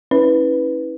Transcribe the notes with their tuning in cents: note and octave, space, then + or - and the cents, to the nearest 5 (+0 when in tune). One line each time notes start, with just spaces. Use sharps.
C#4 -5 E4 -35 B4 +0